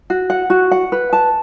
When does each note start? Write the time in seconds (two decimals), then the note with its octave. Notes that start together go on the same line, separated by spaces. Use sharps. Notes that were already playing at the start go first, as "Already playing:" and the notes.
0.10 F#4
0.30 F#5
0.50 F#4
0.71 F#5
0.92 B4
1.13 A5